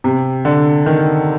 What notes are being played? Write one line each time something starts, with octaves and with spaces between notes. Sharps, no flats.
C3
D3
D#3